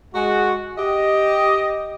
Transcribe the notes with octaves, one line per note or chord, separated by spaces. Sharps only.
G#3 F#4
G4 D#5